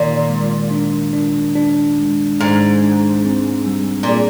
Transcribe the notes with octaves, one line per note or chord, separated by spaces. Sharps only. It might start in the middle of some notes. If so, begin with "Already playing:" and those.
Already playing: A#2 D#3
G#3
D4
D4
D4
G#3
G#2 G#3
D4
C4
G3
A#2
G#4